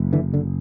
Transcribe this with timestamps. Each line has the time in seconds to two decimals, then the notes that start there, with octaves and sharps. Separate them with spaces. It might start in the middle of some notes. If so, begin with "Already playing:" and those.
Already playing: F#1
0.13 D3 E3
0.34 D3